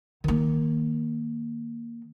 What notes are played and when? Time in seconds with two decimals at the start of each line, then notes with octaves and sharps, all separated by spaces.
0.24 D#3 A#3